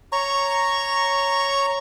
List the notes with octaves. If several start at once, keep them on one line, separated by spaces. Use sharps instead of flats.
C#5 A#5 C#6